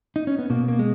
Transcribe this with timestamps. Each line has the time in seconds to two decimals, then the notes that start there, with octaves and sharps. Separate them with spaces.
0.16 D#4
0.27 C#4
0.39 B3
0.50 B2 A#3
0.68 A#3
0.79 G#3